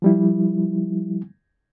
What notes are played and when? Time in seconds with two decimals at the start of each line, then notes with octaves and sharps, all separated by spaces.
0.02 F3 G3 E4